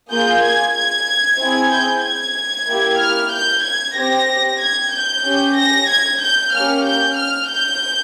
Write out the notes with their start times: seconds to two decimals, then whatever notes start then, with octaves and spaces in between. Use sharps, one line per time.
0.11 A#3 F4 G#4 G6
0.43 G#6
0.76 G#6
1.40 C4 E4 G#4
1.72 G6
2.04 G#6
2.68 A#3 E4 G4
3.00 F6
3.33 G6
3.64 G#6
3.96 C4 G4 A#6
4.61 G#6
4.93 G6
5.24 C#4 G4
5.57 A#6
5.89 G#6
6.21 G6
6.53 A#3 C#4 G4 F6
6.85 G6
7.17 F6
7.50 G6